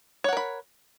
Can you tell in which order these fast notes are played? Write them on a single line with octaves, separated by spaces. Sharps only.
C#5 F#5 A#4 B5